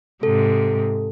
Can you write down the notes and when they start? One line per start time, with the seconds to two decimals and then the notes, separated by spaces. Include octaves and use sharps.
0.23 G#2 C3 A4